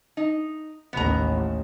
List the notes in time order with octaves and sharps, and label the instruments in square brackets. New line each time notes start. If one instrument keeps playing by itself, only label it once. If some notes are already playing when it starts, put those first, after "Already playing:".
[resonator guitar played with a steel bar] D#4
[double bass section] A1 D#2 [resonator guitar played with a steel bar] B3 A#5